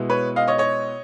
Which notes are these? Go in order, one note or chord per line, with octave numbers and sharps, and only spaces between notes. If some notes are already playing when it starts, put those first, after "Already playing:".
Already playing: B2 G#3 B3 E4
B4 C#5
D#5 F5
C#5 D#5
C#5 D#5